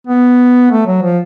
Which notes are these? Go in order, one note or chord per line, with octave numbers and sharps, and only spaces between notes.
B3
A3
F#3
F3